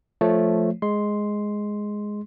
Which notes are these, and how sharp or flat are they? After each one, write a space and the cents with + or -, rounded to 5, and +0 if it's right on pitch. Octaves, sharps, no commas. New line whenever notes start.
F3 +5 A3 +0 C#5 +0
G#3 +0 C6 +0